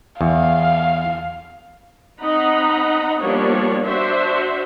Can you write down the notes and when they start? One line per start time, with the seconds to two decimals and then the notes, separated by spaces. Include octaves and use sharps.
0.21 E2 F5
2.20 C4 D#4 D#5 F#5 A#5 B5
3.21 F3 G3 A#3 B3 D4 C#5
3.84 D4 F#4 C5 E5